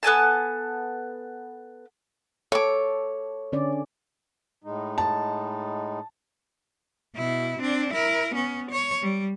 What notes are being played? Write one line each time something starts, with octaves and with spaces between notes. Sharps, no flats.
B3 A4 G#5 A5
A4 C#5 D6
D3 C#4 D5
A2 G#3 D#4
A5
B2 E4
C4 D4
E4 A#4
B3 C#4
C#5
G3